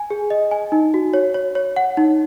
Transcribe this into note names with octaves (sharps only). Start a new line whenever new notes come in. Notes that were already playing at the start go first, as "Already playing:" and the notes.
Already playing: G#5
G#4
D#5
G#5
D#4
F#4
C#5
C#5
C#5
F#5
D#4